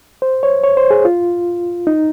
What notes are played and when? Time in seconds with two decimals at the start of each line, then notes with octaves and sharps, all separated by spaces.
0.22 C5
0.43 C#5
0.64 C#5
0.77 C5
0.91 G#4
1.05 F4
1.87 D#4